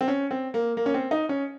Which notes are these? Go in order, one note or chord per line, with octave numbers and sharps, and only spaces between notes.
C4
C#4
C4
A#3
A#3
C#4
C4
D#4
C#4